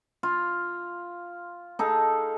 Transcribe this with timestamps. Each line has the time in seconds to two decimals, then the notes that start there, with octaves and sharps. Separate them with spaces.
0.23 F4
1.79 D#4 G#4 A4